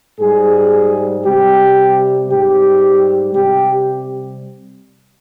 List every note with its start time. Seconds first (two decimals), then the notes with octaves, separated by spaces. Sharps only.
0.19 G#2 G3 G#4
1.24 C3 G3 G4
2.29 G#2 G3 G4
3.35 C3 G3 G4